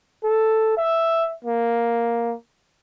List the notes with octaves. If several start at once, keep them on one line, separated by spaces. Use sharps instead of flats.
A4
E5
A#3